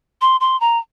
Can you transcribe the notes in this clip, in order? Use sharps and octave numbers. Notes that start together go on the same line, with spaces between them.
C6
C6
A#5